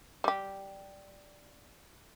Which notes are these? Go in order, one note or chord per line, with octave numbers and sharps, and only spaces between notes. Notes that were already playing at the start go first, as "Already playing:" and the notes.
G3 G4